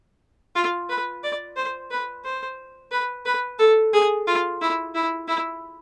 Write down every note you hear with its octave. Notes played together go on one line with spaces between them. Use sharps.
F4
B4
D5
C5
B4
C5
B4
B4
A4
G#4
F4
E4
E4
E4